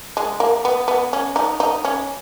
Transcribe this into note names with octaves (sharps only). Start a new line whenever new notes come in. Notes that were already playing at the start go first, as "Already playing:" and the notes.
G#3
A#3
B3
B3
C#4
D#4
D#4
C#4